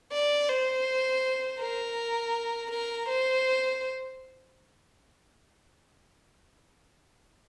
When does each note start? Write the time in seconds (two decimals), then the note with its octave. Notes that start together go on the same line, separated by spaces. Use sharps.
0.12 D5
0.49 C5
1.60 A#4
2.71 A#4
3.08 C5